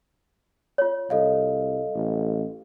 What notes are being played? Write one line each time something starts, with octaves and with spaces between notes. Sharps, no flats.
F4 C#5
C2 A4 D#5 F5
A1